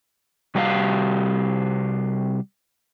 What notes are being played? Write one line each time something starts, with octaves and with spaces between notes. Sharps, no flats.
C3 G3 F#4 G4 B4 F5